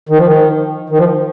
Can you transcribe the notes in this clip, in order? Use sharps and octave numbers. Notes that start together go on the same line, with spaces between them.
D#3
F3
D#3
D#3
F3